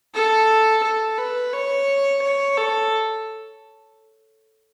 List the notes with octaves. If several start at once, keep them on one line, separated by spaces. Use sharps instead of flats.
A4
A4
B4
C#5
C#5
A4